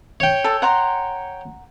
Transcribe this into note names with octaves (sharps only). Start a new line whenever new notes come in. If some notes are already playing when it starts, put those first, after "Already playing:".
C#5 G5
A4
F#5 A#5 C6